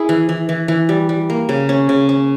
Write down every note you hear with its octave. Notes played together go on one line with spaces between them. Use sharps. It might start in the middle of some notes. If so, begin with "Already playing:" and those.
Already playing: E4 G#4
E3
E3
E3
E3
G3
G3
A#3
C#3
C#4
C#3
C#4